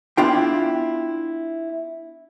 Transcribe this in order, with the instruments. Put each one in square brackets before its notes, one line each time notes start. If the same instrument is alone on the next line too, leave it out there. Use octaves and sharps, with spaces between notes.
[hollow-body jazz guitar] B3 D4 E4 F4 G5